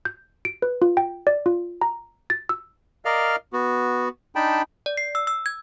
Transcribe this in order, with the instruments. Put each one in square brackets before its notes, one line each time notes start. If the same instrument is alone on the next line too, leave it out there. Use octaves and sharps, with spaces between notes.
[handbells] G6
D7
B4
F4
G5
D5
F4
A#5
A6
E6
[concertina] A#4 D5 D#5 F5 F6
B3 F#4
D4 D#4 G5 A5 B5
[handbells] D5
C7
E6
E6
G#6